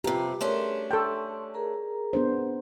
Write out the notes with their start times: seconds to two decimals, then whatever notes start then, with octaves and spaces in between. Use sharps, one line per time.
0.04 F2 C3 G4 B4 A#5
0.41 A3 C#4 D4 G#4 A#4 C6
0.91 A4 G5 A5 C6 C#6
1.54 G#4 A#4 A#5
2.13 B3 D4 C5